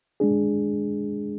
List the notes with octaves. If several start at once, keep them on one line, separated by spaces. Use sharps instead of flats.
G#3 D4 G#4